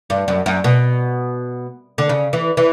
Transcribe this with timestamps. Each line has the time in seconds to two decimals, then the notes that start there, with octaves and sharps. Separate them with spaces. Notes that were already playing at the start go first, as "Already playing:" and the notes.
0.10 G2
0.28 F#2
0.46 F#2
0.64 B2
1.98 D3
2.09 C#3
2.33 E3
2.57 E3